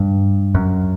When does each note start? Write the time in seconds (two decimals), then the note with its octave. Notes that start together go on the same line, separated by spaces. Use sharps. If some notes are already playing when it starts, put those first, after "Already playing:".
Already playing: G2
0.55 F#2